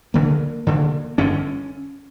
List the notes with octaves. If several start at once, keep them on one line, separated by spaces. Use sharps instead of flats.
E1 D2 D3 A#3
E1 D2 D3
G1 F2 D3 C#4